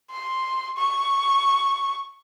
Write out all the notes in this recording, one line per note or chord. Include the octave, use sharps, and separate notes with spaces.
C6
C#6